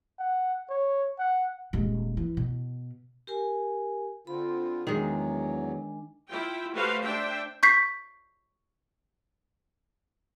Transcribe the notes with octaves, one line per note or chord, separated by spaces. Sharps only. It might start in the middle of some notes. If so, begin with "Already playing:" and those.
F#5
C#5
F#5
D#1 G#3
E3
B2
G4 A#4 G#5
D3 C4 F4 B5
E2 D#3 F#3 G#3 D4 G#5
E4 F4 G5
A3 F#4 G4 B4 C5 F5
D4 C5 E5 G5
C#6 G6 B6 C7